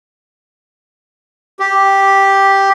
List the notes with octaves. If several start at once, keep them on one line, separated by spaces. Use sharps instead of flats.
G4